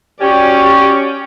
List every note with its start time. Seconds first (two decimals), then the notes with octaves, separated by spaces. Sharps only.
0.21 C#4 F#4 G4 D5